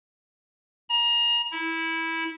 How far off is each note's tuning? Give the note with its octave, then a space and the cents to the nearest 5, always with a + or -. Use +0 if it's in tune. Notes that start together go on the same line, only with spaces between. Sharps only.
A#5 +25
E4 -15